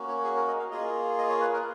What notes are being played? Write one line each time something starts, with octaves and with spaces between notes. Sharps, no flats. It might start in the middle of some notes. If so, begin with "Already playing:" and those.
Already playing: A#3 C#4 F#4
C#5
G#4
A#4
D#5
F5
A#3 F4 G#4 D#5
D#5
C#5
B4
A#4